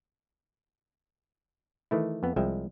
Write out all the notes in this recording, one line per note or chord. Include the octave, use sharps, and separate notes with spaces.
D#3 E3 A3 E4
F2 B3
C2 F3 G#3 E5 G5